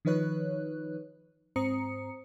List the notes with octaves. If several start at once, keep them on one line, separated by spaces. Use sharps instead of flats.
D#3 F3 D#4 B4 C#5 F#6
G#2 C4 C5 A#5 D#6 C#7